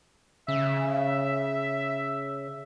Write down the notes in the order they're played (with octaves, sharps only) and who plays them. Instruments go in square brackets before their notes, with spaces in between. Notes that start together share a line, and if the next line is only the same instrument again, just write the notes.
[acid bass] C#3 [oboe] E5